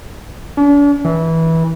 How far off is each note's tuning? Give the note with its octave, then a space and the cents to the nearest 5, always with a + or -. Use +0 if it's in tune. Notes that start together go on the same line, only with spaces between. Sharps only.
D4 -45
E3 -20